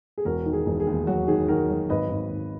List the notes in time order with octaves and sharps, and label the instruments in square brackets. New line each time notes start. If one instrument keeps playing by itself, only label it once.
[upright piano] G#4
E1 F#4 A#4
D#3
G#4
E1
G#4
D#2
F#3 F#4
D#3 G#4
D#3 F#4 A#4
F#3
G#1 B4 D#5
G#1
G#1